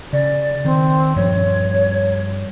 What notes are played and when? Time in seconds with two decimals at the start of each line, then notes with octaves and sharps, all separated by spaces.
0.13 C#3 D5
0.65 D#3 C4
1.16 G2 F3 G3 C#5